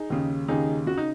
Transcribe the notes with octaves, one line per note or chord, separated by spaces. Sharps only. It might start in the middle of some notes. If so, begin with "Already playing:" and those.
Already playing: D#4 G#4
D#2 C#3
D#2 C#3 D#4 G#4
C#3 F#4
D#4